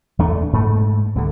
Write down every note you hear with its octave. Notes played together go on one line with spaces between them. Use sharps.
E2 A3 D4
G#2 A3
C2 D3